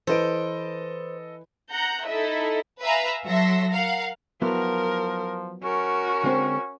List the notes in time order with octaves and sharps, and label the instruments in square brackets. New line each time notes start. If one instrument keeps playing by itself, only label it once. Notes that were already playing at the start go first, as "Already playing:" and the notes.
[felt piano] E3 B4 D7 [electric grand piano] A4 D#5 [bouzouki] C5
[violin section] F#5 A#5 G6 A#6
D#4 E4 A4 D#5 E5
[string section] B4 E5 F5 G#5 A#5
F#3 A4 E5 C6 A#6
A#4 F5 F#5
[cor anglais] F3 [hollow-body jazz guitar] F#3 B3 E4 [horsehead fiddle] A#4
[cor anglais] C#4 [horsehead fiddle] F#4 A#4
[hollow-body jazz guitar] D3 G#3 C4